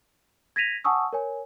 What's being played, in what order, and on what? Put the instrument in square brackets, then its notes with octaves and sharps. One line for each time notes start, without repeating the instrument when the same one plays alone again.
[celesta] G#6 A#6 B6 D#7 F7
F#5 G#5 A5 C#6 D#6 E6
A#4 C#5 G#5